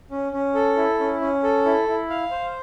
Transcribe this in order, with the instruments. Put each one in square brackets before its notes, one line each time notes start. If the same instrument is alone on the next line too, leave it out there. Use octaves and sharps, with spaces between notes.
[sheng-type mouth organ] C#4
C#4
A4
E4
C#4
C#4
A4
E4
E4
F5
C5